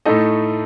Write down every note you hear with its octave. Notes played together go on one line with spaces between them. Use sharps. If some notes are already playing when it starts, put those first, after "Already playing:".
A2 A3 D#4 A4 D#5